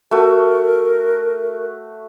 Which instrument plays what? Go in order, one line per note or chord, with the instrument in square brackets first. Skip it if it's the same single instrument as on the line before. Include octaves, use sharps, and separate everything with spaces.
[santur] A3 F#4 [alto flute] A#4